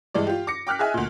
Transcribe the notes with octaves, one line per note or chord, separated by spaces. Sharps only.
G2 E3 G#3 D5
F4 G4
D6 A#6 C#7
G5 D6 F6 F#6 B6
G#4 D#5 E5 G#5
D2 A#2